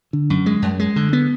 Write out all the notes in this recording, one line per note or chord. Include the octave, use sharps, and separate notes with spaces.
D3
F#2
G#3
F#2
G#3
D3
B3